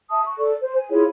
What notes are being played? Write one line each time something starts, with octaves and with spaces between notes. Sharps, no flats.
E5 A5 D#6
C#6
A4 D5
C5
G#5
E4 F4 G#4 C#5